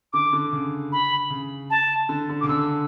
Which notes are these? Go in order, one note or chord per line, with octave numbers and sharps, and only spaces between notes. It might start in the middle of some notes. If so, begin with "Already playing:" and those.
D3 D6
D3
C#3
B5
C#3
A5
D3
D3
D6
C#3
D3 E6